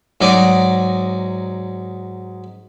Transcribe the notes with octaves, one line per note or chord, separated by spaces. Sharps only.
G#2 F#3 D#4 D5